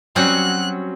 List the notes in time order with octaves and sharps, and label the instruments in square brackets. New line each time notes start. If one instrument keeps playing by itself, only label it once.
[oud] F#3 F#4 [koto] G3 C4 C#4 [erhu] F#6